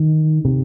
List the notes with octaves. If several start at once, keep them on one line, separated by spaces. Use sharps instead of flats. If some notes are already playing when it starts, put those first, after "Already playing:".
Already playing: D#3
C3